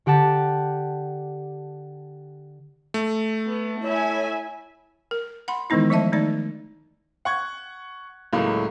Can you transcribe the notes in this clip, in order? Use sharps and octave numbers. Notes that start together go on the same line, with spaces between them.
D3 G4 F#5 A5 A6
A3
B3
E4 C#5 E5 G#5
A#4
F#5 B5 C6
D#3 E3 G#3 B3 D#4 E4
F3 A3 D#5 E5 A5
D#3 A3 D#4 D5
F#5 C#6 G#6
C#2 A2 F#3 A#3